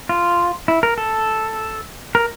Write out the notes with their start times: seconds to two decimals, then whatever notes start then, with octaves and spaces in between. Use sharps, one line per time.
0.09 F4
0.68 E4
0.83 A#4
0.98 A4
2.15 A#4